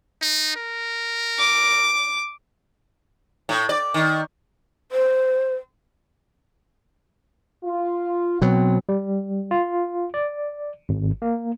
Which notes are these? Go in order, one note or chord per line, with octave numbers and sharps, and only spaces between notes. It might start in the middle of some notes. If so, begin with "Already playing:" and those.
D#4
A#4
D6
A2
D5
D#3
C5
F4
B2 F#3 C4
G3
F4
D5
G#1
A#3